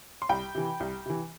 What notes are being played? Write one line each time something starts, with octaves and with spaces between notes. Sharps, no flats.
C6
C2 G5 B5
C3 E3
C2
C3 E3